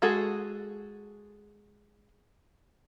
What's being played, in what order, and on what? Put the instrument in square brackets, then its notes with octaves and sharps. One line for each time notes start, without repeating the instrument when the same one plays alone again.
[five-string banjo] G#3 F#4 G#4 A4